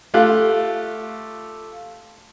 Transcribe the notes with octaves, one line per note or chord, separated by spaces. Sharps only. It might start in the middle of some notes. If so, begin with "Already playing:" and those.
A3 F4 G4 F5 F#6